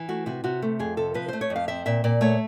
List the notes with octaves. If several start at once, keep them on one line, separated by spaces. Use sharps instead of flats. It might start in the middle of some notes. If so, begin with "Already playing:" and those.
Already playing: E3
A3 F#4
C3 F#4
C3 F#4
A3
F2 G#4
C3 A4
F3 B4
A3 C5
C#5
F2
F5
C4 E5
A#2 E5
A#2 D5
A3 C#5